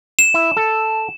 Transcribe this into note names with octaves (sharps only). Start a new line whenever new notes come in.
E7
E4
A4